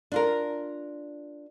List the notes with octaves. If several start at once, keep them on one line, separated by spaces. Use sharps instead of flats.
D4 F4 A#4